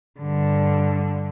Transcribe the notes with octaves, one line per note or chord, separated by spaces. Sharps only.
G2 D3